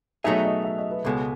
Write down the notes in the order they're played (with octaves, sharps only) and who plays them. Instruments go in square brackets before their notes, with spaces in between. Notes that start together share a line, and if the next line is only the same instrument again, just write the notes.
[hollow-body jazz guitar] B2 F#3 A3 D#4 G#4 [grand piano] E5
[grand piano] D#5
E5
D#5
B4
[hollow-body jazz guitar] C#2 B2 G#3 [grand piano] A4